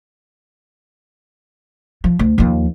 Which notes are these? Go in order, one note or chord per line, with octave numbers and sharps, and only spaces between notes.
F3
D2
D#2 F3